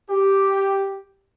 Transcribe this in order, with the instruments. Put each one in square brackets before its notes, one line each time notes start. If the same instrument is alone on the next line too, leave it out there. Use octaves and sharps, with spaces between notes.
[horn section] G4